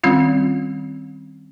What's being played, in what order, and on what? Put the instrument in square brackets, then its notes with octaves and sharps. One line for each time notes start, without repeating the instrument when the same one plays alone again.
[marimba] D#3 G3 C4 C#4 F4